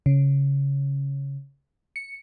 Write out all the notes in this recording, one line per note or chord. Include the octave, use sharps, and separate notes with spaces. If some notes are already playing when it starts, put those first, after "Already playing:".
C#3
C#7